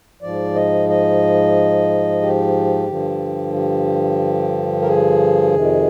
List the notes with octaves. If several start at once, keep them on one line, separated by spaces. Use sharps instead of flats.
G#2 F3 D5
D#5
D#5
G4
G2 D3 F3
G4
A#4
G#4
F2 C3 D#3